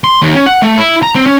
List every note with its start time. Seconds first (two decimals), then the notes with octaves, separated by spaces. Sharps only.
0.04 C6
0.22 D#2
0.35 C#4
0.46 F#5
0.62 A3
0.77 E4
1.03 A#5
1.15 C4
1.26 C#4